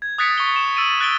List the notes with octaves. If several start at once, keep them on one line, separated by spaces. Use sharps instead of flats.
G#6
D#6 F#6 A6 B6 C#7 D7
C#6 G7
E7
E6 A6 D7 D#7
F#6 A6 D7 G7